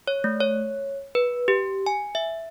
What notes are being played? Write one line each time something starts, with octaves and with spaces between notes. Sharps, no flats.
C#5
A3
C#5
B4
G4
G#5
E5